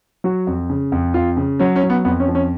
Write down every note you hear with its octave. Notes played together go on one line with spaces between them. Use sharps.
F#3 F#4
F2
C#3
F2
F2 F4
C#3
F#3 C#4
C#4
F#3
B3
F2 B3
C#4
F3
C#4